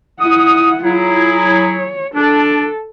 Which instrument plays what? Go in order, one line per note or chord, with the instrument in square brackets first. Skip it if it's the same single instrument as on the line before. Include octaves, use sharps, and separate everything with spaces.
[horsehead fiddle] E4 F#5 [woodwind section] D#6
[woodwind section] F#3 E4 G#4 [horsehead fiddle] F4
[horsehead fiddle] C#5
[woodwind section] D4 [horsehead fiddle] A4